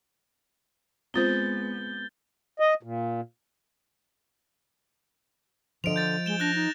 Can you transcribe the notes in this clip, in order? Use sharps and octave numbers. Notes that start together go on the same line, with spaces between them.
G#3 B3 C4 F4 C5 G6 A6 G7
D#5
A#2
D3 F3 D#5 D7 F7
G6 A6 F7
G#3 E7 G7
D4 F#6 A#6 F7
D#4